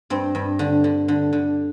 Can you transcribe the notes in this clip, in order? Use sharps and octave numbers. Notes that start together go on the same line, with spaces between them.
G2 C4
G2
D3
D3
D3
D3